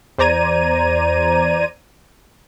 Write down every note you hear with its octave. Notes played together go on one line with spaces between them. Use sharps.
E2 C5 D5 A#5 G#6 D#7